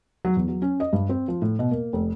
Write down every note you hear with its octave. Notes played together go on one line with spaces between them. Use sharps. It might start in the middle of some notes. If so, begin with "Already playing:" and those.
F#3
E2
F#3
C#4
D#5
G2
C4
F3
A2
B2
A#3
F1